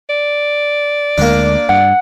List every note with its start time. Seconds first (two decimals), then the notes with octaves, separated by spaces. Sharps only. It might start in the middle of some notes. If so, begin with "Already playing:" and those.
0.10 D5
1.18 D2 D3 G#3 A#3 D4
1.69 G2 F#5